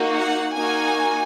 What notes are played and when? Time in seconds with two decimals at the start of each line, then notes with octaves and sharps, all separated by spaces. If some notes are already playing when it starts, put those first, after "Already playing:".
Already playing: A#3 D#4 F#4
0.16 F#5
0.55 A#3 D#4 F#4 G#5